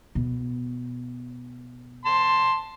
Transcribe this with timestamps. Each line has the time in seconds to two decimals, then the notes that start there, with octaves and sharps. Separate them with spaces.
0.15 B2
2.05 A5 C6